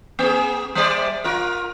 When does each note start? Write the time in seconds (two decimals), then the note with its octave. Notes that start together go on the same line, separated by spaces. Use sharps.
0.19 A#3 G#4
0.75 G3 C5 D5
1.24 F4 A#4